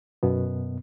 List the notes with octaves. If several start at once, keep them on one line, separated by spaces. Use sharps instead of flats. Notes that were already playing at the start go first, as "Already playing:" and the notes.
F#2 B2 B3